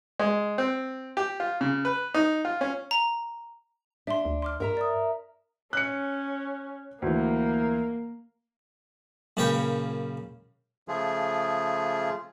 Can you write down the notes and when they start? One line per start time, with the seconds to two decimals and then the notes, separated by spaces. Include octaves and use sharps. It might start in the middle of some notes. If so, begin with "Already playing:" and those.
0.20 G#3
0.58 C4
1.17 G4
1.40 F4
1.61 C#3
1.85 B4
2.14 D#4
2.45 F4
2.61 C#4
2.91 A#5
4.07 D4 E5 C6
4.25 D2
4.42 C6 D6 F6
4.60 G2 A#4 E5 A#5
4.77 D5 D#6
5.73 C#4 F#6 C#7
7.02 D2 E3 A#3
9.37 F#2 A#2 C#3 B4 C#5 G5
10.88 C#3 F3 A3 F4 G#4